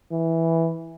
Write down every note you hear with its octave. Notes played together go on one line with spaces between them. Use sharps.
E3